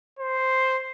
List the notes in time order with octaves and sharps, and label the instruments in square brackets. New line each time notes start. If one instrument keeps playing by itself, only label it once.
[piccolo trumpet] C5